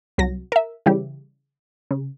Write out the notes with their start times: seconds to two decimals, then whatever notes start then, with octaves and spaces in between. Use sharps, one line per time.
0.18 C2 F#3 A#6
0.52 A#4 E5
0.86 C#3 E3 G3 E4 G4
1.91 C#3